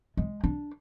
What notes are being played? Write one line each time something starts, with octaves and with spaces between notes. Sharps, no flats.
G#3
D4